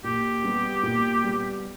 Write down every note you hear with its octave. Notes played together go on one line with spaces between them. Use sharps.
A#2 G4
G3 B3
A#2
G3 B3